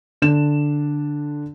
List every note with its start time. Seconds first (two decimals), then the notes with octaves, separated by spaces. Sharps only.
0.22 D3 D4 E7